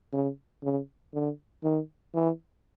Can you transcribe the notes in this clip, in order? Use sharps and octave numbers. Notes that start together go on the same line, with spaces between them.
C#3
C#3
D3
D#3
E3